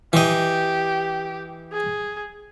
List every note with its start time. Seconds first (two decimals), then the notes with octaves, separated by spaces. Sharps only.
0.13 E3 G4 D#5
1.72 G#4